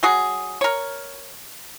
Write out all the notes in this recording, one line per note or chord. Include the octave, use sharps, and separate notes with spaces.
F#3 F#4 G#4
A#4 C#5